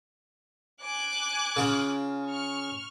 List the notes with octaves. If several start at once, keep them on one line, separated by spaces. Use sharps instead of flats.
G#5 D6 F#6
C#3 F4
C#6 F6